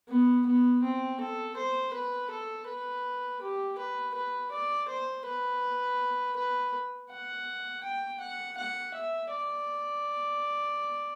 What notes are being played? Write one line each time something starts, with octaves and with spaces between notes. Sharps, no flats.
B3
B3
C4
A4
C5
B4
A4
B4
G4
B4
B4
D5
C5
B4
B4
F#5
G5
F#5
F#5
E5
D5